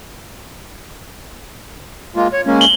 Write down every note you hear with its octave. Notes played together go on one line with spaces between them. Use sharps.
G#3 A#3 F4
C#5
G#3 A#3 C#4
F#7 G7